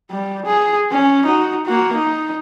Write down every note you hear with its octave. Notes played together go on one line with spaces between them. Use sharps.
G3
G#4
C#4
D#4 F#4
A#3 F#4
D#4